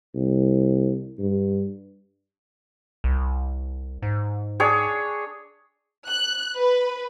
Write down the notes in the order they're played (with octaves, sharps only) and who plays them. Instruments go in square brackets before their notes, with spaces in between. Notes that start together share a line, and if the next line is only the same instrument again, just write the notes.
[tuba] C2
G2
[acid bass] C2
G#2
[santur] D4 G#4 C#5
[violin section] F#6
B4